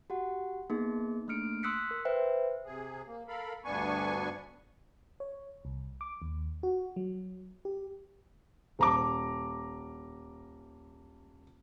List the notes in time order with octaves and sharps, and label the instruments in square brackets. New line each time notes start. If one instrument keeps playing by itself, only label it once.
[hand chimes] F#4 G4 F#5
A#3 B3 D#4 G#4
A3 A#3 D4 F6 C#7 D7
C6 D#6 E6 F#6 B6 C#7
A#4
B4 C5 E5 G5
[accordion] C3 G#4
A#3
A4 A#4 F5 B5
D2 G2 B3 D4 G#5 C#6
[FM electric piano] C#5
C2
D6
D#2
F#4
F#3
G4
[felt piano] D#1 A#5 D6